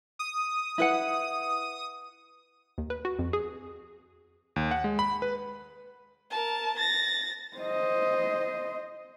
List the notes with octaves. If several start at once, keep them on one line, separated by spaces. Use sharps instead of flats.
D#6
E4 B4 F#5
D#2
B4
F#4
F2
G#4
D#2
F#5
G#3
B5
B4
A#4 A5
A6 A#6
C5 D#5